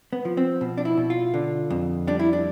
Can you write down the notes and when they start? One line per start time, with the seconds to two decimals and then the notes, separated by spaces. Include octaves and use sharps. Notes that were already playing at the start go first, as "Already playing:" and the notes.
0.13 B3
0.25 F3
0.37 C4
0.61 B2
0.78 D4
0.85 E4
0.97 B2
1.10 F4
1.34 D3
1.70 F2
2.07 G3 D4
2.19 E4
2.33 D4